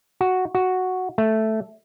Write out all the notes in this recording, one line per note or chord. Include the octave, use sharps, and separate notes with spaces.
F#4
F#4
A3